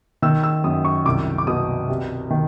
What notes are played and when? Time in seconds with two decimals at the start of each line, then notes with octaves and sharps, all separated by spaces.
0.22 D#3 E6
0.43 E6
0.64 F#2 D#6
0.85 C#6
1.05 C2 D6
1.38 D6
1.47 B2 D#6
1.89 C3
2.31 D#3